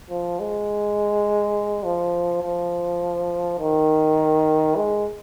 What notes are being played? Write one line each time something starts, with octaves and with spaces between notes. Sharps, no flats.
F3
G#3
F3
F3
D#3
G#3